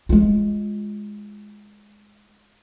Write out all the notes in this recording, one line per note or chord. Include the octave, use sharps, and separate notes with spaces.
G#3 F4